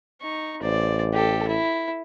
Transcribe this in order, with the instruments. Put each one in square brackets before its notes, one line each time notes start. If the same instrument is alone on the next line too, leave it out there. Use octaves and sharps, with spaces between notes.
[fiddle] D#4 C#6
[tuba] A1 [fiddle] C5 D5
[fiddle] G4 A4
E4